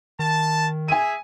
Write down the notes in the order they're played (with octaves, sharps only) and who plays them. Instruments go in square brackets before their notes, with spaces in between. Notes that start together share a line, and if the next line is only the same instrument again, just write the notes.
[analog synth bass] D#3 [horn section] A5
[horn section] G#4 E5 [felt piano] G#5 D#7